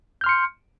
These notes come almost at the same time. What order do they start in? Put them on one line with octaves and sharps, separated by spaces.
G6 F6 C6 C#7